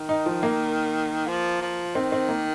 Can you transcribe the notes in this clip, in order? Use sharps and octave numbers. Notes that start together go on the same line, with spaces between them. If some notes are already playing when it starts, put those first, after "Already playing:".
Already playing: D#3
D#4
F3
A#3
F3
F3
D#3 C4
C4
A#3